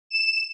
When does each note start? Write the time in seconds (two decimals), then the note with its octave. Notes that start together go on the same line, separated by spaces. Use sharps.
0.10 E7